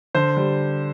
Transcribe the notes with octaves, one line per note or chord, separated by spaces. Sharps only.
D3 C5
G3